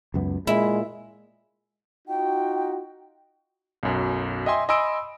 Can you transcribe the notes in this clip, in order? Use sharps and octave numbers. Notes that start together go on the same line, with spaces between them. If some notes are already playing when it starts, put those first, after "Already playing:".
C#2 F#2 B3
A#2 G#3 E4
D#4 F4 F#4 G5
B1 F#2
D#5 E5 G5 G#5 C6
D#5 G#5 B5 C6 E6 D7